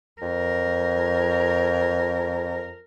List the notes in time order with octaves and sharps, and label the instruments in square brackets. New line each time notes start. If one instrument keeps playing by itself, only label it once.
[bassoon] F2 [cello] A#4